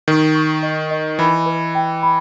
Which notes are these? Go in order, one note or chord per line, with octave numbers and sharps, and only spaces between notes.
D#3 C#6
C#6
D#5
D#5
E3 B5
B4
G5
B5